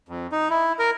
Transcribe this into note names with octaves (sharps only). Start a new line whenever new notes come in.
F2
D#4
E4
A#4